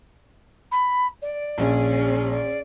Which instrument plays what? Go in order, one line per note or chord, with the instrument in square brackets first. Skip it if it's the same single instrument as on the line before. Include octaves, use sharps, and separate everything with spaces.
[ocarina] B5
D5
[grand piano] A#1 [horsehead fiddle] C#4 G#4
[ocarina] D5